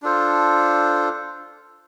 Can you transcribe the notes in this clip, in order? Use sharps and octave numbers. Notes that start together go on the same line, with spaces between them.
D4 F4 A4 C5